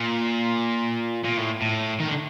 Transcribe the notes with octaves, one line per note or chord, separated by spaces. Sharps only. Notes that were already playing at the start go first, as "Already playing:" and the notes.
Already playing: A#2
A#2
A2
A2
D#3
D3